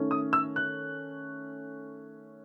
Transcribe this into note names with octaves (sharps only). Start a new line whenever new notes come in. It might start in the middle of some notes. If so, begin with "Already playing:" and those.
Already playing: D#3 A3 C#4
D#6
E6
F#6